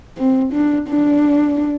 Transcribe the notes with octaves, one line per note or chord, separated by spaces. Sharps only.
C4
D4
D4